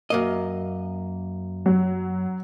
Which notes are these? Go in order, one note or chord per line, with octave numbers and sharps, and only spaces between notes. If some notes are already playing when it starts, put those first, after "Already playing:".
F#2 A#3 D#5
F#3